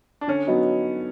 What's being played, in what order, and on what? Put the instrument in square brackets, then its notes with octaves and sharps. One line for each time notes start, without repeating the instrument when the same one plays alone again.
[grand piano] D4
[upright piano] D3 [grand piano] C#4
[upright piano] F#3 B3 D#4 F#4